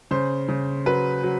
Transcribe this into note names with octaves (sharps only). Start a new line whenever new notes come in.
C#3 C5
C#3
F#3 B4
F#3